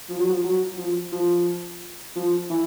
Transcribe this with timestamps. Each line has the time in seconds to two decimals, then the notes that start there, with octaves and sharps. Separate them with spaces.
0.09 F3
0.19 F#3
0.30 F3
0.44 F#3
0.78 F3
1.12 F3
2.16 F3
2.50 E3